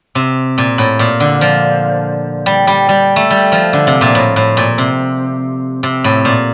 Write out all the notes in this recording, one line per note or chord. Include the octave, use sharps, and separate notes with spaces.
C3
A#2
A2
A#2
D3
F3
G3
G3
G3
A3
G3
F3
D3
C3
A#2
A2
A2
A#2
C3
C3
A2
A#2